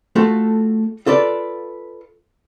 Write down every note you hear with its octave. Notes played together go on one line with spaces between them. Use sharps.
A3 F4 F#4 A4
F4 A4 B4 D5